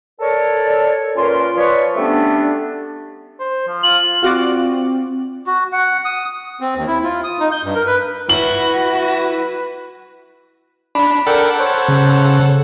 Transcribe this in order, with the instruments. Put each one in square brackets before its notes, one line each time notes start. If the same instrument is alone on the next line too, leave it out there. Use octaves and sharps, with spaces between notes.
[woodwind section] A4 A#4 C#5 D5
A#2 C#4 F4 A#4 B4 C6
F3 B4 C#5 D5
G3 A3 B3 C#4 D4
[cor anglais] C5
F3
[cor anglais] F4 [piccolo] F#7
[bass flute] C4 [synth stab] F4 F#4 D5
[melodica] F#4
F#5
D#6
[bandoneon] C4
D#2
E4
F4
D#6
D#4
G6
G2
A#4
B4
[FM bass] E4 [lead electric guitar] F#4 [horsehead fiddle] B4 [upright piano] F#7
[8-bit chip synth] D4 [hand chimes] B5
[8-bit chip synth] A4 F#5 [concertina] A#4 D5 G5
[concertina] C5 C#5
[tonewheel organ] C#3